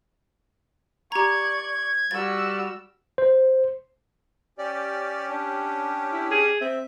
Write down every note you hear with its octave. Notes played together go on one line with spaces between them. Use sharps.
G4 D5 A#5 C#6 G#6
G3 F#4 E6 A6
C5
C#4 G4 D5
D4
E4
G#4
C4 E5